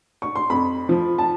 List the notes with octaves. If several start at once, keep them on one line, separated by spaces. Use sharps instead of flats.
C#6
C6
F2 B5
F3
A5